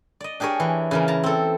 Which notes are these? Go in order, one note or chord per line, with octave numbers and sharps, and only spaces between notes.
D5 D#5
D4 G4 G#4 A#4 C#5
E3
C#3 E3 A#3
A5 A#5
C4 A4